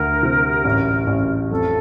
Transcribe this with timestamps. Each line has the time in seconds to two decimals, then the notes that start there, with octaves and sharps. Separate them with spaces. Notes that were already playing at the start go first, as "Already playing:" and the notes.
Already playing: D2 A#4
0.23 C3
0.65 A1
1.07 A1
1.50 F2 A4